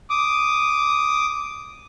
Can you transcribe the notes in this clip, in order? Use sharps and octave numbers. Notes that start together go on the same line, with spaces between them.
D6 D#6